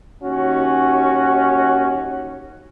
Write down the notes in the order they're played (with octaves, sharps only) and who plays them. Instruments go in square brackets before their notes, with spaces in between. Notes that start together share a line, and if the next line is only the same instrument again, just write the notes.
[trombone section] D#2 C#4 F#4